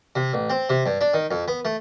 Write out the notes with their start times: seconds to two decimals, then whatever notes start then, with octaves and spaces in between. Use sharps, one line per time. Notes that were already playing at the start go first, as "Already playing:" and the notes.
0.16 C3
0.33 A1
0.50 C4
0.70 C3
0.86 G2
1.01 D4
1.14 D#3
1.31 F2
1.48 B3
1.65 A3